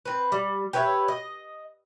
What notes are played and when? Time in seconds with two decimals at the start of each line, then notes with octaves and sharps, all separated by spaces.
0.05 C4 B4
0.32 G3
0.73 G4 B4 C#5 E5
1.08 D#5